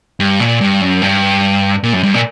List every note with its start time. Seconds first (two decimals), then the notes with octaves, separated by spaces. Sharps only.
0.20 G2
0.40 A#2
0.61 G2
0.81 F#2
1.02 G2
1.83 A#2
1.93 F#2
2.03 G2
2.14 A#2